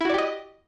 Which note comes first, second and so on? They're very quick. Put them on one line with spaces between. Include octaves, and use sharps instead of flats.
E4 F#4 D5 G4 D#5